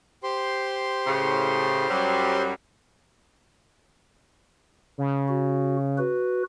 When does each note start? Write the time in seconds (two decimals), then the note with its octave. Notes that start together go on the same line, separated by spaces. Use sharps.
0.23 G4 C5 C6
1.06 A2 C#3
1.89 F#2 F#3 G3
4.98 C#3
5.28 F#4
5.98 F#4 B4